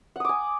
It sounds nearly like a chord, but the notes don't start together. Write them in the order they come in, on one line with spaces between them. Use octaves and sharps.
F#5 D#6 D6 G#5